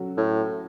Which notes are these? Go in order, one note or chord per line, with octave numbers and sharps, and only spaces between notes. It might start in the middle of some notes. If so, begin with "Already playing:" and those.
Already playing: F#3 C#4 F#4 A4
A2